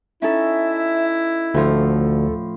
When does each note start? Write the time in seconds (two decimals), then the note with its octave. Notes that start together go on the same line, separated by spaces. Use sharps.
0.22 C#4 D#4 E4 A4 E5
1.54 D2 A2 F3 A4